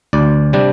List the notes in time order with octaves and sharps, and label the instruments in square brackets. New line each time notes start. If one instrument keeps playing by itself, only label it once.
[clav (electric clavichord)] D2 D5
C3 G3 D4